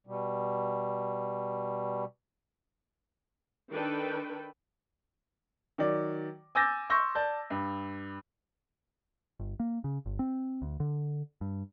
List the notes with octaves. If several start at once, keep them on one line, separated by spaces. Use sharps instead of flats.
B2 G3
D#3 D4 A4 B4 G5
D#3 F#3 D5
G#5 D6 E6 G6 A6 A#6
C6 C#6 E6 G6 A#6
D5 A5 G6
G2
G1
A#3
C#3
G1
C4
D2
D3
G2